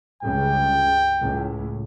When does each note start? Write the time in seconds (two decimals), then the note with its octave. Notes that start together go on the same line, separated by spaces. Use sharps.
0.22 C#2 G2 C#3 G5
1.20 C#2 A2